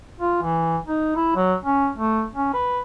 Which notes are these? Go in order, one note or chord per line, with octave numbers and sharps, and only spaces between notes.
F4
E3
D#4
E4
F#3
C#4
A3
C#4
B4